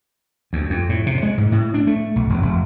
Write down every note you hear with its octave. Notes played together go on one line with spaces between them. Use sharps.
D2
F2
A2
C3
G#3
G#2
A2
D4
A3
B1
E1
F1